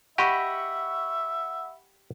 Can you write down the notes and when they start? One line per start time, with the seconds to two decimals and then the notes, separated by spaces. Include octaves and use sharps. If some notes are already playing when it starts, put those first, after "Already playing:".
0.18 G4 D#5 E5 F#5 B5 C#6